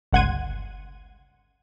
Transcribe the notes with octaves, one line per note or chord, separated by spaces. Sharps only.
G1 C#2 F#5 C6 G#6 D#7